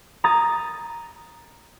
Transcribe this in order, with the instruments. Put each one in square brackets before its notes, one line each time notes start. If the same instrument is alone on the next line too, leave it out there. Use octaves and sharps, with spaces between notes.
[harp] A#5 D#6 A6